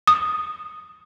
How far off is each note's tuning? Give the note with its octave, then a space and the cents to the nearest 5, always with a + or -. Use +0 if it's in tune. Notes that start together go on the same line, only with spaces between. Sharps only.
D#6 -5